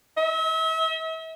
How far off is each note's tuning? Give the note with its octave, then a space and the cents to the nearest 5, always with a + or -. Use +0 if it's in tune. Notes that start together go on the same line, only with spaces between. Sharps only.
E5 -40